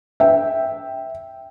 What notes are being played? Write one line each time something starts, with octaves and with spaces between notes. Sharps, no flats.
E5 G5